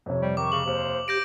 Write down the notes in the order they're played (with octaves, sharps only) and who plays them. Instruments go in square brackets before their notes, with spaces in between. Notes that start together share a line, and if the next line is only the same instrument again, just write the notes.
[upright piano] F2 C3 [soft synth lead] C#5
[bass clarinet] G3
[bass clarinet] D#3 [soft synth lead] C#6 [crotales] D6
[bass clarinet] C#3 [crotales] F#7
[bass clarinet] D#2 [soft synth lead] C5
[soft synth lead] G4 [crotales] G6 A#6 D7